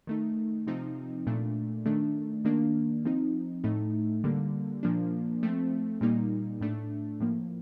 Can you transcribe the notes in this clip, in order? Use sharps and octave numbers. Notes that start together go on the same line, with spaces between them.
D#3 A3 D#4
C3 F3 C4 D#4
A#2 A3 D4
D#3 A3 D4
D#3 A#3 D4
F3 C4 D#4
A2 A3 D#4
D3 G3 A#3
A#2 F3 A#3 D4
F3 A3 C4
A#2 G3 A#3 D#4
A2 A3 D4
A2 F3 A#3